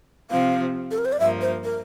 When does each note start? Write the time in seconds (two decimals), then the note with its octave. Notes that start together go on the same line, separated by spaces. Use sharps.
0.31 C3 F3 C4 F5
0.91 A4
0.98 A#4
1.05 C5
1.12 D5
1.19 G2 F3 A#3 E5
1.41 C5
1.64 A#4